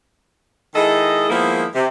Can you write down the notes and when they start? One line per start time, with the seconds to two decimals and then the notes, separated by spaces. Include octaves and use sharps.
0.75 D#3 G#3 E4 A4 D#5
1.30 D#3 F3 G#3 A#3 B3 E4
1.74 C3